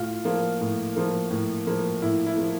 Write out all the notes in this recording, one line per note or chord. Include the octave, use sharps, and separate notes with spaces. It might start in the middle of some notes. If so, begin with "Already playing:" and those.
Already playing: A2 F4
F3 A#3
A2
F3 A#3
A2
F3 A#3
A2 E4
E4
F3 A#3